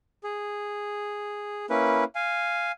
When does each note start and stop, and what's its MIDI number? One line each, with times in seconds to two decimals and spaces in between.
0.24 1.66 68
1.70 2.04 58
1.70 2.04 61
1.70 2.04 64
1.70 2.04 71
2.15 2.72 77
2.15 2.72 80